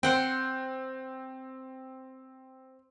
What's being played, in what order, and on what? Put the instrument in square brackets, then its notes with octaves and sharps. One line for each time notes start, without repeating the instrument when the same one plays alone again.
[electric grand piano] C4 [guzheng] C5 F#5 G5